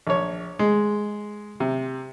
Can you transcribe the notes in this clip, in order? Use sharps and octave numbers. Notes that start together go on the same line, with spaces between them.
A#1 C#5
G#3
C3